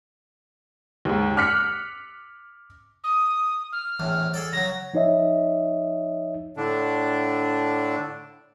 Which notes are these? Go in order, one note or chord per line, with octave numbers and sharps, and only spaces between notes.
D#2 G#2
D6 F6 F#6 B6 C#7
D#6
F6
A#1 E2 A2
G#4 A4 D5
C#3 F#3 A#6
F3 D#4 C#5 D#5 E5
A2 D3 D4